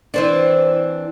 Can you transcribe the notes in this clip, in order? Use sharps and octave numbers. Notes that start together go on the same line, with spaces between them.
E3 C4 D4